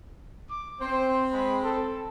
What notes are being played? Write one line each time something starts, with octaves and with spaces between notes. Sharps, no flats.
D6
C4 C5
G#3 B5
A4